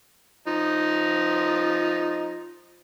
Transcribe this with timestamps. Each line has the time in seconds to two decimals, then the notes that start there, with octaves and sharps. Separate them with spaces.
0.47 F3 D#4